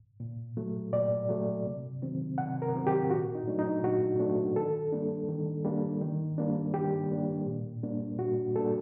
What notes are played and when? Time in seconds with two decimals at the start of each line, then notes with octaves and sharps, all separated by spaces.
0.20 A#2
0.57 F#3 A3
0.93 A#2 D5
1.29 F#3 A3
1.66 C3
2.02 D#3 F#3 C4
2.38 C3 F#5
2.62 A#4
2.74 D#3 F#3 C4
2.87 G4
3.10 A#2 F#4
3.35 D#4
3.48 F#3 A3 D4
3.59 D#4
3.83 A#2 F#4
4.19 F#3 A3 D4
4.56 D#3 A4
4.92 G3 A#3 D4
5.29 D#3
5.65 G3 A#3 D4
6.02 D#3
6.38 G3 A#3 D4
6.74 D#3 G4
7.10 G3 A#3 D4
7.46 A#2
7.83 G3 A#3 D4
8.19 A#2 F#4
8.55 G3 A#3 D4 A4